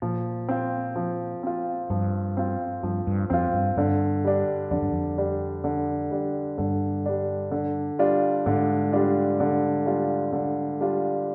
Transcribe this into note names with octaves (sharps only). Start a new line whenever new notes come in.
A#2 F3
C4 F4
F3
C4 F4
G2 F3
C4 F4
G2 F3
G2
F2 C4 F4
G2
G2 D3
G3 D4
F2 D3
G2
F2
G3 D4
D3
G3 D4
G2 D3
G3 D4
D3
G3 D4 F4
G#2 D3
G3 D4 F4
D3
G3 D4 F4
D3
G3 D4 F4